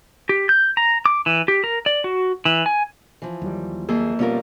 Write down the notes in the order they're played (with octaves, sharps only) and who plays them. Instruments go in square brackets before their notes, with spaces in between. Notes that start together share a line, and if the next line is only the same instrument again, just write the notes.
[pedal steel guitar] G4
G6
A#5
D6
E3
G4
A#4
D5
F#4
E3
G#5
[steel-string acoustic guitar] E3 F3
[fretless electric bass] D#2 F#3 G3
[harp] F2 A#3 E5 [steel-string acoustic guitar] G#4
[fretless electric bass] B2 A#3 B3 [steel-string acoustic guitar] G3 F4 [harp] C#4 A#4